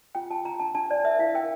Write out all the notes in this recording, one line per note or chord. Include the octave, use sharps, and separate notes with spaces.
F4 G5
F4 A5
F4 A#5
D4 A5
D4 A5
C5 D5
A#4 E5
E4 F5
A#4 G5